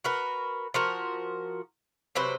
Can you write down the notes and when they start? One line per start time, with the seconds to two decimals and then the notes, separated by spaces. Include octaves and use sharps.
0.04 F#4 A#4 B4
0.74 F3 F#4 A#4
2.15 C3 F#3 B4 C5